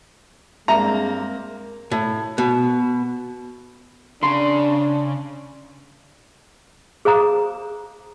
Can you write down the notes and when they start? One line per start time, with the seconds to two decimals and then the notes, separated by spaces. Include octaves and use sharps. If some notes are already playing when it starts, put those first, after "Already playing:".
0.68 G2 G#3 A#3 C4 E5 A5 A#5
1.92 A2
2.38 B2
4.23 C#3 D4 C6
7.05 G#4 C5 F5 A#5 D#6